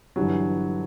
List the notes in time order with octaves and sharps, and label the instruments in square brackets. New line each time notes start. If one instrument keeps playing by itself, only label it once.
[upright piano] G1 G2 E3 G3 [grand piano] F#3